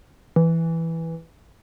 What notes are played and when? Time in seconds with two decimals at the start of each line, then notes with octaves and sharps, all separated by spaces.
0.36 E3